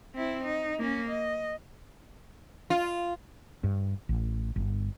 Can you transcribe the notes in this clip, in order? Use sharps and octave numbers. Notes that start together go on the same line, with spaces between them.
C4 E4
D#4
A#3 C#4
D#5
F4
G2
A1
G1